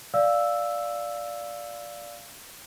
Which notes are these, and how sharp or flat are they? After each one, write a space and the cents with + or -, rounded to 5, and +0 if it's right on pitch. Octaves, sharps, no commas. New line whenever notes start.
D5 +0 F5 +0 E6 +0